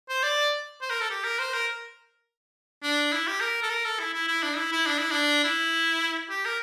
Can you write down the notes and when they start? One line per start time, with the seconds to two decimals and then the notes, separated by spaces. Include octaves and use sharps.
0.09 C5
0.23 D5
0.81 C5
0.90 A#4
1.01 A4
1.10 G4
1.24 A#4
1.39 C5
1.54 A#4
2.83 D4
3.12 E4
3.27 G4
3.41 A#4
3.63 A4
3.70 A#4
3.84 A4
3.99 E4
4.13 E4
4.28 E4
4.43 D4
4.56 E4
4.72 E4
4.86 D4
4.98 E4
5.11 D4
5.44 E4
6.30 G4
6.45 A#4